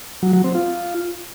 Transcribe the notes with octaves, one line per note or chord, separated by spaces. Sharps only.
F#3
F#3
C4
F4